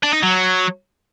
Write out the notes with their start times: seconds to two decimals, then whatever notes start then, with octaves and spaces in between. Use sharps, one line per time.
0.03 D4
0.13 D#4
0.23 F#3